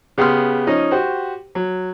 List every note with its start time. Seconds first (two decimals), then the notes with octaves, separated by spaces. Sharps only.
0.18 C#3 B3 G4 C6 D#6 F6
0.67 F3 C#4 D#4 D#5
0.91 F#4 G4 C5
1.55 F#3